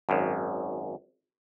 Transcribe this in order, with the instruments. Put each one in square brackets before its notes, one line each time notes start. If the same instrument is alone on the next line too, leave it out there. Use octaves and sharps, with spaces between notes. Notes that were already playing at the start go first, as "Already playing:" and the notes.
[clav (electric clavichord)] G#1 F#2